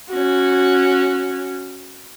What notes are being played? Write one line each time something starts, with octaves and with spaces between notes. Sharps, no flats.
C#4 F#4